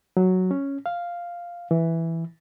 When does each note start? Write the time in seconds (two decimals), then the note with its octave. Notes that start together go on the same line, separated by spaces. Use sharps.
0.17 F#3
0.51 C#4
0.86 F5
1.71 E3